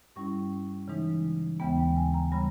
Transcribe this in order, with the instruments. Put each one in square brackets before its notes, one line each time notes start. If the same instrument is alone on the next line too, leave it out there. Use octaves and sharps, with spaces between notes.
[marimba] G2 G3 C#4 E4 C#6
C#3 E3 G#3 D#4
D#2 C#3 E3 G#3 B3 G5
G5
G#5
A#5
C#3 G3 B5